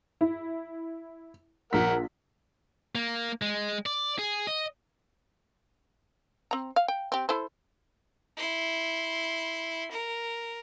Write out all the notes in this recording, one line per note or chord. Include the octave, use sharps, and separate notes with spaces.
E4
A#1 A#4 F#5 B6
A#3
G#3
D5
G#4
D#5
C4 A#5
F5
G5
C4 G4
E4 A4 C5
E4 C6
A#4